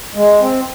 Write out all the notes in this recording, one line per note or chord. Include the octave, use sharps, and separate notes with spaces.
G#3
C4